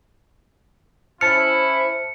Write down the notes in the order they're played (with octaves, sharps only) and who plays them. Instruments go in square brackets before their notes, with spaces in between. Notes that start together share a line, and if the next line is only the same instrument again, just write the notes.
[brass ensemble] C#4 E4 [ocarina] C5 [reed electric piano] A5 F6 [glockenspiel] C#7